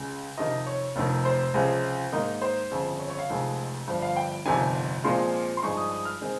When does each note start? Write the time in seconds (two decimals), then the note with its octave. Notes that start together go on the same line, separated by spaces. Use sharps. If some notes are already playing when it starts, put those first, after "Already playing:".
Already playing: C#2 C#3 G#3
0.38 F2 C3 D#3 D#5
0.67 C#5
0.96 F1 F2 D#3
1.25 C5
1.54 C#2 C3 F3 G#3 C#4
2.12 G#2 D#3 A#3 D#4
2.42 C5
2.71 G1 F2 C#3
2.99 C#5
3.10 C#5
3.19 F5
3.29 F1 F2 D#3 G#3
3.88 G1 G2 F3
4.02 F5
4.16 G5
4.46 G1 F2 C3 D#3 G#5
5.03 A#2 F3 G#3 C4 F4 C6
5.57 C6
5.63 G2 F3 G#3 D#4 C#6
5.77 D#6
5.91 D#6
6.05 F6
6.21 D#3 G#3 C4